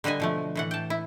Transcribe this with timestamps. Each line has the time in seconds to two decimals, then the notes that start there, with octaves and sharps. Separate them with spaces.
0.04 D3 G3 B4 D#5 G#5
0.20 B2 F3 A3
0.55 A2 E3 F#5
0.71 G5 A5
0.90 E4